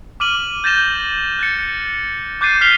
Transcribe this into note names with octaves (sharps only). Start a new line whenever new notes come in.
D6 F6 D#7 F#7
G6 A6 A#6 E7 G7
F#6 A6 C#7
D6 F#6 G6 A6 C7 D#7
F6 F#6 B6 C7 F7 G7